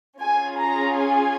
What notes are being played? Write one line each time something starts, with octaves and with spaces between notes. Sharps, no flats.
C#4 F4 G#4 G#5
A#5
G#5